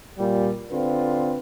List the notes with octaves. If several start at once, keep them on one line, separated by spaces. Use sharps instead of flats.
A#2 G3
D3 C4 F4 B4